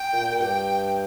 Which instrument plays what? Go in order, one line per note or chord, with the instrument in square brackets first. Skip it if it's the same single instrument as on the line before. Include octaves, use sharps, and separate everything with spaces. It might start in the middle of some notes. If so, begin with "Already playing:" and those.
Already playing: [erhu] G5
[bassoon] A#2
A#2
[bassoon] G2 [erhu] G5